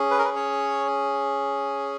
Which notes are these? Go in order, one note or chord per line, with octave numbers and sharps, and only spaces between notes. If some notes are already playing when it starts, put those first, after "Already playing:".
Already playing: C#4 G#4
B4
A#4
B4
C#5